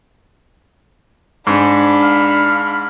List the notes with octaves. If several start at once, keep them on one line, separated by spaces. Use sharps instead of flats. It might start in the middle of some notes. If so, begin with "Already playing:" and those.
G#2 D4 B5
F5